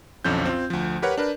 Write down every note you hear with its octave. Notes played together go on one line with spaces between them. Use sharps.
B1 F2 D3 F3 C#4 G6
C4 F4
D2 F3
G4 A#4 B4 C#5 F#5
D4 A#4 B4 D5